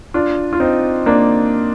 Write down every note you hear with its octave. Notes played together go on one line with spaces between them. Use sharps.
D4 F4
F4
C4 D#4
A#3 D4